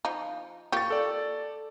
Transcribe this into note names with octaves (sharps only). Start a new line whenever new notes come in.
F3 D#4
A#3 F4 G4 C#6 A6
A4 D5